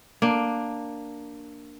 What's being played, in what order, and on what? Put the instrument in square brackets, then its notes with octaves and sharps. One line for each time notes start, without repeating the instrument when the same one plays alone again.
[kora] A#3 D4